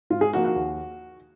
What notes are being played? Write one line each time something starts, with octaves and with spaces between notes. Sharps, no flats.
G#2 F4
G#4
F3 A#3 D#4 F#4
F#4
D#2